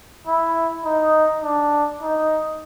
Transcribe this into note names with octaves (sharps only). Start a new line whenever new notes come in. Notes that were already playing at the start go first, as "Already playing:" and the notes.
E4
D#4
D4
D#4